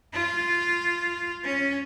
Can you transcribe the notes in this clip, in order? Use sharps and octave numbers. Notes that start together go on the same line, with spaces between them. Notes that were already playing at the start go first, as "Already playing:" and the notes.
F4
C#4